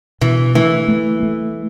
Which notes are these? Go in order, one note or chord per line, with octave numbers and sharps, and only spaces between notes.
B2 E3
E3 A3
A3
A3